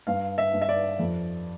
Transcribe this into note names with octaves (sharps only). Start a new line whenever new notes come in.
G2 F5
E5
G2
E5
D5
F2